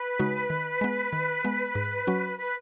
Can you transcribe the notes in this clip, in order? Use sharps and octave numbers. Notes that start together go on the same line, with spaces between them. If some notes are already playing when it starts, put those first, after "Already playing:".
Already playing: B4
C#3 G#3 D#4 F#4
D#3
G#3 B3
D#3
G#3 B3
G#2
F#3 C#4 F#4
B4